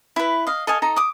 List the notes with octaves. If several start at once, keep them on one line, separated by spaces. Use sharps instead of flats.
E4 B4
D#5 F5
A4 D#5 F5 G#5
D#4 A4 A#5
D6 D#6